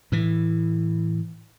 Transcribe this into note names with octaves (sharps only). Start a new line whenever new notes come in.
A2 E3